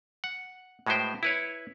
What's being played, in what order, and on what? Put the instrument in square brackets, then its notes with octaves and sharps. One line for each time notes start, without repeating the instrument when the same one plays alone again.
[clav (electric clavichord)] F#5
A2 G#3 F#4 B4 C5 G5
E4 B4 C#5